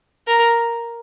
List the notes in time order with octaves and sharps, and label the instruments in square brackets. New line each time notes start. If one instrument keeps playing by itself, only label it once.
[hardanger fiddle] A#4